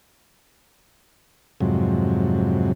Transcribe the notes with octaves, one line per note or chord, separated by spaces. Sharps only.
F2 G#2 C3 F#3